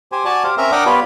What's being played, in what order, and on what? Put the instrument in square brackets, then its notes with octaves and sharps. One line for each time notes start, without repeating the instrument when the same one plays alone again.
[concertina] G4 C5 G#5
F#4 D5 G#5 A5
G4 C5 F5
C4 C#4 A#4 E5 A#5
D4 A#4 F#5 G5 D6 D#6
B3 F4 G4 B4 C#5 D5